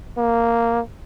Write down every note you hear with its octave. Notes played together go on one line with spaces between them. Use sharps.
A#3